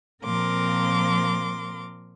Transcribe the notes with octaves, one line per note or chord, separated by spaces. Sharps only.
A#2 F3 C4 A#4 C6 D6